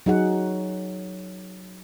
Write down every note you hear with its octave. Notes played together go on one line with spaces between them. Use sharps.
F#3 D#4 G#4 F#5